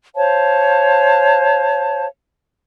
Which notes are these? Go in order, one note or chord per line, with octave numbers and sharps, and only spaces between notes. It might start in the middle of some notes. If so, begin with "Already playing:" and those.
C5 C#5 F5 A5